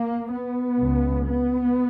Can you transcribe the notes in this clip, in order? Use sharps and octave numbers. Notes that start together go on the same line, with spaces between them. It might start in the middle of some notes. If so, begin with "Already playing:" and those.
Already playing: A#3
B3
C#2 C#3
B3